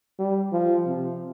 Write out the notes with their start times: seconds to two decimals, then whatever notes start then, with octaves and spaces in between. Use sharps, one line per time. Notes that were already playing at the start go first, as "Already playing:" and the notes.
0.19 G3
0.52 F3
0.86 C3